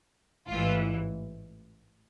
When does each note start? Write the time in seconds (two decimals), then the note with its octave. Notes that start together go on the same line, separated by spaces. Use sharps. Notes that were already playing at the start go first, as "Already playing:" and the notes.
0.50 A1 G#2 E3 F4